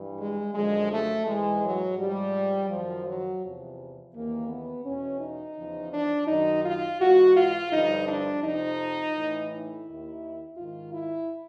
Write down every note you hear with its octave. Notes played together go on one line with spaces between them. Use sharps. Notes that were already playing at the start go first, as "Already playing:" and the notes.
Already playing: G2 E3
G#3
F#2 D3 F3 G#3
A3
G#2 E3 G#3
F#3
G#2 F3 G3
F#2 D#3 F3
F#3
E2 C3 F3
D#2 C#3 E3 A#3
B3
E2 B2 C#4
D#4
E2 C#3 F3
D4
F#2 D#3 D#4
F4
G#2 E3 F#4
F4
G2 D3 F3 D#4
D4
F2 C3 F3 D#4
A2 E3
E4
D#2 D#3
G#2 D#3 F4
E4